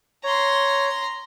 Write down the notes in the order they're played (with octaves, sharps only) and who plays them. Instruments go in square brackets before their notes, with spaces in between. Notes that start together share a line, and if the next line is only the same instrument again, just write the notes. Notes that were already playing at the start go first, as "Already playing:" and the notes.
[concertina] C#5 [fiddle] A#5 C6